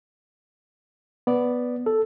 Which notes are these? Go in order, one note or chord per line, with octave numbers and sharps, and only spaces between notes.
B3 D5
A4